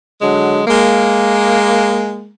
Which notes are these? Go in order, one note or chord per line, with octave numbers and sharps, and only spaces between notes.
D3 F#3 G#3
G#3 A#3